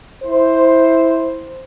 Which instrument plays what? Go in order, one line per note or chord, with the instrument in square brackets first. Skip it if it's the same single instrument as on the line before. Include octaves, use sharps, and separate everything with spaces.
[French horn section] E4 C5